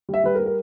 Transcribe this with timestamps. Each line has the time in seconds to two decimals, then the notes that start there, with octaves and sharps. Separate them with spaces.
0.09 G3 E5
0.24 G3 B4
0.35 A#4
0.40 G3
0.46 A#4